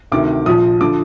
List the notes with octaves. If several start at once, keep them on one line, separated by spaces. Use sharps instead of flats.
D2 C3 D#3 D6
A#1 A#2 F3 D#6
D3 F3 D6